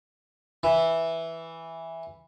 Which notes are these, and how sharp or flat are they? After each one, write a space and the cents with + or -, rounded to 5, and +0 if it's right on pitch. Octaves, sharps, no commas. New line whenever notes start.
E3 -5